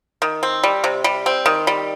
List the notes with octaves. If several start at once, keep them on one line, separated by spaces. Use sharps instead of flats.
D#3
C4
G3
C3
G3
C4
D#3
G3